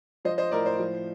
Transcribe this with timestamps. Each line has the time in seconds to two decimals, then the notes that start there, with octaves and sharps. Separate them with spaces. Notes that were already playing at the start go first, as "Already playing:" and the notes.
0.25 F3 C5 D#5
0.38 C5 D#5
0.51 A2 A#4 D5
0.66 C5
0.79 F3